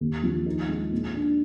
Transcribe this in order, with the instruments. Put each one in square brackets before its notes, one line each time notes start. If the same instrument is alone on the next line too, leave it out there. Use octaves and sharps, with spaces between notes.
[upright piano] D#2
F3
D#4
G#3
A#2
D4